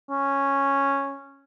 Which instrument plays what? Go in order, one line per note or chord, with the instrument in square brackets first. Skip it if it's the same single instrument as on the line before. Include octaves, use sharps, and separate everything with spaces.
[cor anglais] C#4